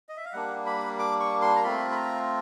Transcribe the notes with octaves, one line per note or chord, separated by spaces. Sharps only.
D#5
E5
F5
G3 A#3 D4 F#5
B5
D6
C#6
C6
A#5
A3 C4 F4 B5
B5
A#5